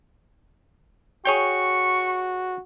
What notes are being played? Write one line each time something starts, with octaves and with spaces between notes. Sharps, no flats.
F#4 G#4 C#5 G5 C#6